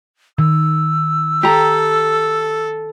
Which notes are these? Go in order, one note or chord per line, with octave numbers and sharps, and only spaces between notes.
D#3 E6
G4 A4 A#5